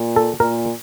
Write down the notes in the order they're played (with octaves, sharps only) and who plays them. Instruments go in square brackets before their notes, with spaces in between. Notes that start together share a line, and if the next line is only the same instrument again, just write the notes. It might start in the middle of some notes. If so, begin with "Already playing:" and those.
Already playing: [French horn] A#2
[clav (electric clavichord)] A4
[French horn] A#2 [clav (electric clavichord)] A#4